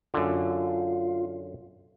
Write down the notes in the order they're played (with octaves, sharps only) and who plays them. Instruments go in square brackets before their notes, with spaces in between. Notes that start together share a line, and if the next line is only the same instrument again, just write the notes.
[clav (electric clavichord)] F#2 D3 [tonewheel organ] F4